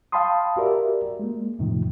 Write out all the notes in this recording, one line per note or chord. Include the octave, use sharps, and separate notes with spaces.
F5 G5 A5 B5 C6 D#6
F#4 G4 A#4 D5 E5
G#3 A#3
F2 A2 C3 D#3 F3